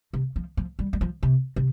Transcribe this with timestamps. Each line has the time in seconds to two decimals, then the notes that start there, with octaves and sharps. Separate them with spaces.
0.13 C3
0.36 F3
0.57 F3
0.79 G3
0.93 G3
1.01 F3
1.23 C3
1.56 C3